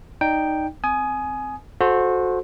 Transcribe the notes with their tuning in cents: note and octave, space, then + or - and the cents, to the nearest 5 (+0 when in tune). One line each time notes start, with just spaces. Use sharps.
D#4 -10 D5 +0 G5 +0
C4 -15 G#5 +20 D#6 -10
F#4 -25 A4 -20 C5 +0